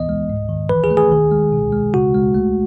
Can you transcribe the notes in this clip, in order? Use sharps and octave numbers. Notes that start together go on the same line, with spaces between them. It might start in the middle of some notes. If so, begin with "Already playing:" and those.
Already playing: E3 B3 D#5
G#3
G#2
D#3
E3 B4
G#4
A3
G#4
D#3
G#3
B2
G#3
C#3 F#4
G#3
A3